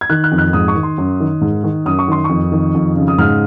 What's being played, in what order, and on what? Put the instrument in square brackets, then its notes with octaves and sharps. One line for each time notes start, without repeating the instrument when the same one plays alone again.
[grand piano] G#6
D#3 F#6
F#6
F2
F#6
G#2 D#6
C#6
D#3
C6
F#2
D#3
G#2
D#3
F#2 D#6
C#6
D#3 C6
C#6
F2
D#3
F2
C#3
D#6
G#2 F6